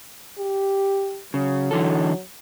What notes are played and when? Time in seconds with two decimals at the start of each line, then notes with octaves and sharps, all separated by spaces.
0.38 G4
1.34 C#3 F#3
1.71 D3 E3 A4